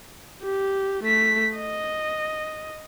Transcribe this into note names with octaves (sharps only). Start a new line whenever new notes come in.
G4
A3 B6
D#5